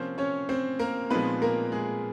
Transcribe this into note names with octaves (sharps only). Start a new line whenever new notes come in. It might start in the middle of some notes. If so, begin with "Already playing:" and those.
Already playing: C3 F3 A#3 C4 C#4 C5
C#4 C#5
C4 C5
A#3 A#4
A#2 F3 G#3 B3 C4 D#4 B4
A#3 A#4
G#3 G#4